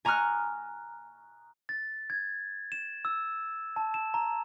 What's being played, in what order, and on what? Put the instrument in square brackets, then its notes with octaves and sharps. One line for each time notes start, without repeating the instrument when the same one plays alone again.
[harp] G#5 A#5 C#6 D#6 F6 F#6
[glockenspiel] A6
G#6
E7
E6
A5
E7
A#5